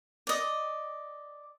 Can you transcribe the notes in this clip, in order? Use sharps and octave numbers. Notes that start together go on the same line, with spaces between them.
D5 D#5